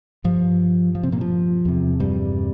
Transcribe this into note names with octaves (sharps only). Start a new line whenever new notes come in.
G2 F3
F3
C3 C4
A#2 A#3
F3
E2 C3
G2 G3